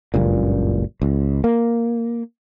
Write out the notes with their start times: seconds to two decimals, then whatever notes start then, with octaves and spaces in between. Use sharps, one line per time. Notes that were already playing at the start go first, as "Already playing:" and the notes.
0.14 F#1 C#2 G2 A#2
1.02 C#2
1.44 A#3